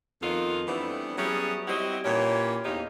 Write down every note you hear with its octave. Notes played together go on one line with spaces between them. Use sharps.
F2 D#3 B3 F4 A4 D#5
E3 G3 A3 B3 C4 D4
F#3 G3 B3 C#4 E4 G#4
G3 C4 E4 F#4 G4 D#5
A#2 E3 C#4 G4 C#5
E2 G#2 C3 D#4 G4 F5